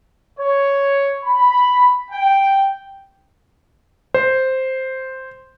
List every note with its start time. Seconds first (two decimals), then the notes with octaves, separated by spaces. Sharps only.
0.39 C#5
1.24 B5
2.11 G5
4.14 C5